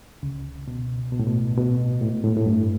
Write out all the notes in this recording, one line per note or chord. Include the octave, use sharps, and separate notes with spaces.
C#2 C#3
B2
B2
A2
B2
B2
A2
A2
A2
G2